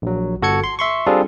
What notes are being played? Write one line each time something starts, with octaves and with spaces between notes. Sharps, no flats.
A#1 F#3
G1 F#4 A4 G#6 C#7
C6
E5 C6 C#6
G3 C4 D4 F4 G#4 A4